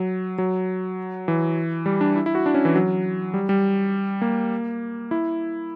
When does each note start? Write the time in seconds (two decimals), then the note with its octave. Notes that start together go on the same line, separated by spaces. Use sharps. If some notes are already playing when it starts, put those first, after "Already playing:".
Already playing: F#3
0.38 F#3
1.28 E3
1.86 G3
2.01 D4
2.16 E4
2.26 E4
2.35 F#4
2.46 D4
2.54 C#4
2.65 E3
2.75 F#3
3.34 G3
3.49 G3
4.22 A#3
5.11 E4